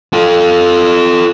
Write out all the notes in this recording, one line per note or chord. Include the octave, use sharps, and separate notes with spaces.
F4 A4